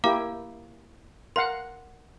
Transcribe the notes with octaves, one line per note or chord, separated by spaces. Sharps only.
A#3 E4 G4 F5 A#5 D6
A#4 F5 F#5 C6